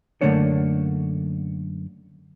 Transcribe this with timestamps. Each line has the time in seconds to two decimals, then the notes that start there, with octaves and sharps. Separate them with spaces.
0.21 F#2 D3 A3 A#3 D4 C#5